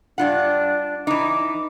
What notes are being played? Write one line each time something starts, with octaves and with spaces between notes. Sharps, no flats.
G2 D4 F4 F#5
E3 D#4 D6